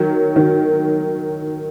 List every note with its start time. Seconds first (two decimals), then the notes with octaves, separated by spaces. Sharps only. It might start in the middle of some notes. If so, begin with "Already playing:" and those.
Already playing: D#3 F#3
0.36 D#3